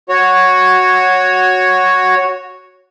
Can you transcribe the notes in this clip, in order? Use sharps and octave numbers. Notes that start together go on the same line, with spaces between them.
F#4 C#5